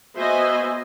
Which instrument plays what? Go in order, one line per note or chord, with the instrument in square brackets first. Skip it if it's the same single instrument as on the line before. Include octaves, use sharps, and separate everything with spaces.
[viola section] B3 F#4 C5 D#5 E5 G#5